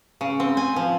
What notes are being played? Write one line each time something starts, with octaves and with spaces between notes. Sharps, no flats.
C#3
C4
G#5
F3